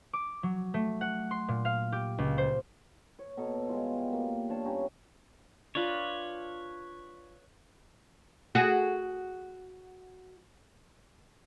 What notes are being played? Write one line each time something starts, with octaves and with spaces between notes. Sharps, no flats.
D6
F#3
A3
F#5
C6
A#2
F5
G4
C#2
C5
C#5
B2 A4 B4 A#5
G3 G#3 F4
A#3
D4 C#5 F5 A5
G2 C#4 G4 A#5
D4 F4 B4 C#5
F#4 G#4